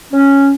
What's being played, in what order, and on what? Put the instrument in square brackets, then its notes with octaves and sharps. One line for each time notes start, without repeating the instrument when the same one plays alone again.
[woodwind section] C#4